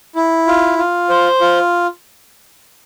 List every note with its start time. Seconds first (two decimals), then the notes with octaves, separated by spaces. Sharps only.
0.16 E4
0.47 F4
0.78 F4
1.09 C5
1.41 F4